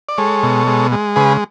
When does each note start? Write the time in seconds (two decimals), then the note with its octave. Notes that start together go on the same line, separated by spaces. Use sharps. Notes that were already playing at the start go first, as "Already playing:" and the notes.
0.09 D5
0.18 G#3 A4 C#5
0.43 B2
0.67 G#3
0.92 G#3
1.16 C#3 G#4 B4